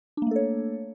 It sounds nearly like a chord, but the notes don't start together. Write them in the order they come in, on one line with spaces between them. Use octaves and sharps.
D4 A#3 A3 A4 C#5